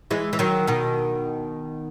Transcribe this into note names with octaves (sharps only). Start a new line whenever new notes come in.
E3 G#3
E3
D#3 F#3
B2 D#3